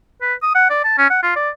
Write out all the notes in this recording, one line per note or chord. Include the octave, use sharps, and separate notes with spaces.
B4
D#6
F#5
D5
A5
C#4
F#5
F4
D5